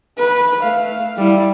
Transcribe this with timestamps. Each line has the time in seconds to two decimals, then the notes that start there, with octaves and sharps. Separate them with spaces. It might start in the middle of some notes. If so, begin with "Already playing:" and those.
0.18 B4
0.62 A3 F5
1.17 G3 E4